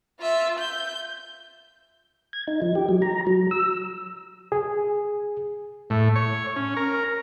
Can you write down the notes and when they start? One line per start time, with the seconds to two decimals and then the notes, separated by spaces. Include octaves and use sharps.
0.20 F4 E5
0.59 G6
2.33 G#6
2.48 D#4
2.62 F3
2.75 G4
2.89 F#3
3.02 A#5
3.27 F#3
3.51 E6
4.52 G#4
5.90 A2
6.16 C#5
6.56 C#4
6.77 A#4